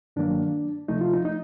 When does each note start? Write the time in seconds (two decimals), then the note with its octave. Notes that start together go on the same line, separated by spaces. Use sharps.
0.16 G2 D#3 F#3 A#3 D4
0.88 D2 C3 F3 A3 D#4
1.01 F4
1.13 D#4
1.25 D#4